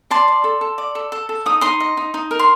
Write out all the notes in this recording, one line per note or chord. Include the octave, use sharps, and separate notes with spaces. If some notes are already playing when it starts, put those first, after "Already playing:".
D5 A5 C6
D5
A4
A4
D5
A4
A4
A4
D#4 D#6
D#4 C6 D#6
D#5
D#4
D#4
A#4
C6